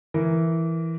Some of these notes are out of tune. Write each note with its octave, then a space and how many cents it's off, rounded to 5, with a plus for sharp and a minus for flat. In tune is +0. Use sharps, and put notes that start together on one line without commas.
E3 +0 A#4 +0